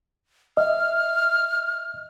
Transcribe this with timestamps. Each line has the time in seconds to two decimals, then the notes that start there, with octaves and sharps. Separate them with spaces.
0.57 D#5 E5 F6